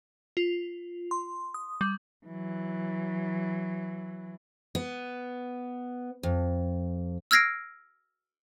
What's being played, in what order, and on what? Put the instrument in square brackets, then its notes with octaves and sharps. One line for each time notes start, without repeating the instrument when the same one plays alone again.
[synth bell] F4
C6
D#6
G3
[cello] E3 F#3
[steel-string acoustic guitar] B3
F2
[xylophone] E6 F6 G#6 A#6 C7 D7